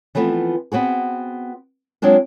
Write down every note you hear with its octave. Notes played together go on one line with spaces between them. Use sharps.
E3 F3 A3 B3 C4
B3 C4 F#4 G#4
F#3 G#3 C4 D4 F4